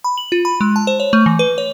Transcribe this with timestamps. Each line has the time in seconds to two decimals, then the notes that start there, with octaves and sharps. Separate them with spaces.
0.04 B5
0.18 F#7
0.32 F4
0.45 B5
0.61 G#3
0.76 A5
0.87 C5
1.00 C#5
1.13 A3
1.26 E3
1.39 B4
1.58 C#5